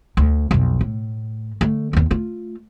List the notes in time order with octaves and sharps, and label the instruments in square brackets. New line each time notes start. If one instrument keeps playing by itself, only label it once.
[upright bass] D2
B1 F2
A2
D3 A3
D#2 C4
A3 F4